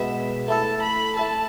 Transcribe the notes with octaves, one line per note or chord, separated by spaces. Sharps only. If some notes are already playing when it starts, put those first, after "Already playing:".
Already playing: B2 G#3 B3 E5
A3 E4 A4 A5
B5
A3 E4 A4 A5